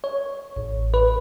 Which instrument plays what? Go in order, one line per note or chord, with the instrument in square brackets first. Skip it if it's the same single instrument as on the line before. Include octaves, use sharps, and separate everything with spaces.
[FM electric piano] C#5
A1
B4